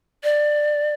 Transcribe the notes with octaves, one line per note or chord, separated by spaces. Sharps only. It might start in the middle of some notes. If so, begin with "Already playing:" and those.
D5